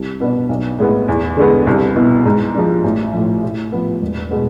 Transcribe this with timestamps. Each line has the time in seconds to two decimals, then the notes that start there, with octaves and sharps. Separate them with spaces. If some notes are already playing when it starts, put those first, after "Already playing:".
Already playing: C2
0.20 B2 B3 D4
0.49 B1
0.78 A2 G#3 B3
1.08 E2
1.37 D3 G#3 B3
1.67 C2
1.96 B2 B3 E4
2.25 G#2
2.54 F3 G#3 D4
2.84 A1
3.13 A2 F3
3.43 A2
3.72 F3 B3
4.01 E1
4.30 B2 G#3 B3